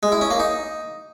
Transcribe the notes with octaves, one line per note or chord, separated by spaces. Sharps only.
G#3
E4
C#4
A#3
D#4